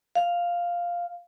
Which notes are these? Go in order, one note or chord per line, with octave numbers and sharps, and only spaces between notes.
F5